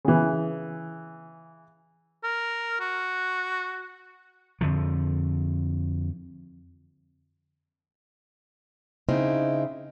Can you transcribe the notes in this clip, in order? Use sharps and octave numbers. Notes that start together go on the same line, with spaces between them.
C#3 E3
A#4
F#4
F2 D3 F3
C#3 C4 D#4 E4